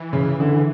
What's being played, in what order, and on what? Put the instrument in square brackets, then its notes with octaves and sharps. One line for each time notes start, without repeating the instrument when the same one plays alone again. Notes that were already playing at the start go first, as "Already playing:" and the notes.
Already playing: [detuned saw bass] E3
[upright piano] C#3
D3